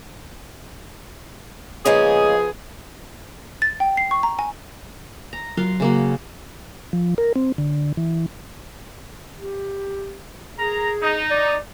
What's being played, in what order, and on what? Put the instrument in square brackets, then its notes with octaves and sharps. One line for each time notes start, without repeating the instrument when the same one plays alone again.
[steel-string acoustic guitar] C#3 G#3 A#3 [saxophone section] F3 B3 G#4
[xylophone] A6
G5
C7
C#6
A#5
G#5
[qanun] A#5
[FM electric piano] F#3 [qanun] F4 A#4 F5
[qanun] C#3 A#3 F#4
[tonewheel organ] F3
A#4
C4
D3
E3
[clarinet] G4
[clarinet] G#4 [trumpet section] A#4 A#5
[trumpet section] D#4
[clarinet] D5